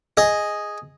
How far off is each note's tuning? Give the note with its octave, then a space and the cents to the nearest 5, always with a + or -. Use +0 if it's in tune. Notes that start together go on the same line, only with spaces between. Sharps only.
G#4 +0 D#5 +0